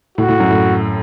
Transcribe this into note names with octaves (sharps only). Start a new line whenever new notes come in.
A2 F#4
A2
F#2
A2